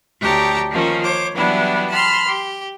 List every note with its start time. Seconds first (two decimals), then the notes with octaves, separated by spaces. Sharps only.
0.20 D2 G4 C#5 G5 A5 A#5
0.70 D#3 F3 A#3 C#4
1.03 C5 C#5 D6
1.34 E3 F#3 G3 B3 D4 E4
1.90 A5 B5 C6 F6
2.27 G4